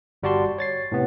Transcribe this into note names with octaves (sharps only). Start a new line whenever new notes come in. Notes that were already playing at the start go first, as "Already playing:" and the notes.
G1 G3 F#4 D5 A5 C6
C#5 A6 C7
A2 C3 B3